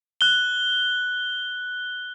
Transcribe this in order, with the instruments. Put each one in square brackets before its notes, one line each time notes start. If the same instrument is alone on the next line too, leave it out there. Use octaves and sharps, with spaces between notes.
[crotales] F#6 G7